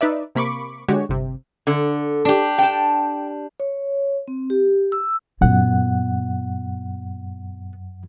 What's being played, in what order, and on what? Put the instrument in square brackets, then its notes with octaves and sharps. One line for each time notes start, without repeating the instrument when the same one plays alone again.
[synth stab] D#4 B4 D5 E5
C3 A#3 B5 C#6 D6
D3 G#3 F#4 G4 C#5
G1 C3
[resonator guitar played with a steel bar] D3
[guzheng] D4 G4
[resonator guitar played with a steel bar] G5 A5
[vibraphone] C#5
C4
G4
E6
[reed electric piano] F#2 F#5 [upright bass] A#2 B3